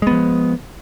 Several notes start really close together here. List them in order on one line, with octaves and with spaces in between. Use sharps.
G#3 B3 F3